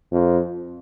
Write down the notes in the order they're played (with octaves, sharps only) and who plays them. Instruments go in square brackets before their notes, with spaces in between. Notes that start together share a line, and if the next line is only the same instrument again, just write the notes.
[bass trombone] F2